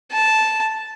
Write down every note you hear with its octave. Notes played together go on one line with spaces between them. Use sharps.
A5